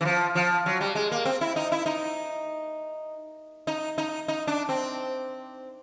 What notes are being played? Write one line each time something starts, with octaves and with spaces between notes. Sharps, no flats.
E3
F3
F3
F#3
G3
G#3
A#3
C4
E4
D#4
E4
D#4
D#4
D#4
D#4
D4
C4